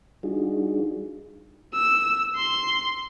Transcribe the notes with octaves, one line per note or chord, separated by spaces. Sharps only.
G3 D4 D#4 F4 F#4 G#4
E6
C6